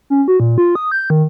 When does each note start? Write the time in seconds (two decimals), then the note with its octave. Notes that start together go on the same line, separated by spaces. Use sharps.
0.10 C#4
0.28 F#4
0.40 A#2
0.58 F4
0.75 D#6
0.92 G6
1.10 D#3